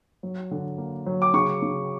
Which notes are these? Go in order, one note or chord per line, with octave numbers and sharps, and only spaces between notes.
F#3
D3
A#3
F#3
D6
C#3 C#6
C#3